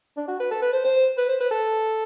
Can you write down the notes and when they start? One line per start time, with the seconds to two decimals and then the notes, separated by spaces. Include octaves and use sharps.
0.17 D4
0.28 F#4
0.40 B4
0.51 A4
0.62 B4
0.73 C5
0.84 C5
1.18 B4
1.29 C5
1.41 B4
1.51 A4